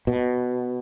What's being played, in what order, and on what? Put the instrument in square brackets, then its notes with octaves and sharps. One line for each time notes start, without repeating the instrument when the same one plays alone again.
[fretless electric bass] B2